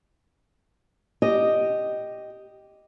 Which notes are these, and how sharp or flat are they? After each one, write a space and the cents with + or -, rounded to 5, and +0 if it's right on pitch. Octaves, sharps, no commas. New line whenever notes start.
G4 +0 D#5 +0